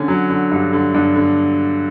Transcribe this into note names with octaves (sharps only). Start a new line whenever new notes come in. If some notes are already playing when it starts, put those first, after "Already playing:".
Already playing: D3 C#4
F#3
D3
G2
D3
G2
D3